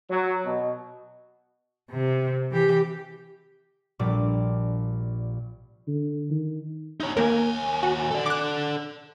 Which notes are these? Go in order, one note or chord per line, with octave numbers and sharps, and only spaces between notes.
F#3
B2
C3
E3 G4
A#1 A#2 G3 D6
D3
D#3
D#4 C#5
D#2 A#3 A#4 G#5
F#4
A4 D5
D6 F#6